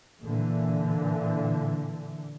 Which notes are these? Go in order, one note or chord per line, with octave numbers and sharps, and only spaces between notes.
A#2 D3 E3